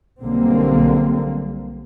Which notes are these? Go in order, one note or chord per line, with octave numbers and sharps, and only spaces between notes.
B1 D3 G3 A#3 C4